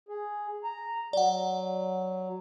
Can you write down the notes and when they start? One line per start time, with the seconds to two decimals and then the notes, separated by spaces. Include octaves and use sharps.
0.09 G#4
0.64 A#5
1.13 F#3 D5 F#5